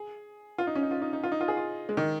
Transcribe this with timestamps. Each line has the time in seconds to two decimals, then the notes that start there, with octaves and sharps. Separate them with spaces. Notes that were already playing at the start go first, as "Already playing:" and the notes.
Already playing: G#4
0.58 F4
0.67 D#4
0.75 C#4
0.83 D#4
0.91 F4
1.02 D#4
1.13 D#4
1.23 F4
1.32 D#4
1.41 F4
1.48 G#4
1.57 F4
1.89 G#3
1.97 D#3